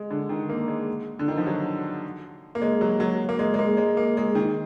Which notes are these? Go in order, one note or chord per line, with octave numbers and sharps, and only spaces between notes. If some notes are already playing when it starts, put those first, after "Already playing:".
Already playing: G#3
D3
D#3
A#3
G#3
D3
D#3
F3
F#3
A#3
G#3
F#3
F#3
A#3
G#3
G#3
A#3
G#3
A#3
G#3
D#3